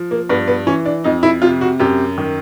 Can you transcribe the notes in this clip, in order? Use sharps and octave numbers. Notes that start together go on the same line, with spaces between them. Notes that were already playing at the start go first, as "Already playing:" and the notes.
Already playing: F3
A#3
G2 B3
B3
E3 C#4
D4
F2 D#4
E4
C3 F4
F#4
F#2 G4
D#3